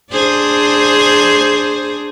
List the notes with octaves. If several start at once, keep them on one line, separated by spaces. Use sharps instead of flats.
D4 G#4 C5